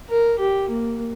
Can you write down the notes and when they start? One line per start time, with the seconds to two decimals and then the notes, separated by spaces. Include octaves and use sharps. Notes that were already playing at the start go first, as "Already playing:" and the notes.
0.09 A#4
0.40 G4
0.69 A#3